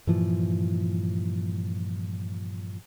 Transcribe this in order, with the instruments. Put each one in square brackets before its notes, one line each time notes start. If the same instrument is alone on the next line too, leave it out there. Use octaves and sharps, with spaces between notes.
[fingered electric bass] G2 A#2 E3 F3